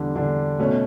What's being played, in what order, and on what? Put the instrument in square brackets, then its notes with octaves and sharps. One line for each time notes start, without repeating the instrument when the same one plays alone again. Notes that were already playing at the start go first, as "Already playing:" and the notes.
Already playing: [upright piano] E2 D3 G3 D4
E2 D3 G3 D4
B2 A3 C#4